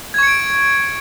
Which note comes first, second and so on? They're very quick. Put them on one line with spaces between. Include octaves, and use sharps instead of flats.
G#6 C#6 C#7 D7